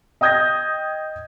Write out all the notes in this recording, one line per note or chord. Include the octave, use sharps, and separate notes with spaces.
D#5 G5 D#6 G6 G#6 A#6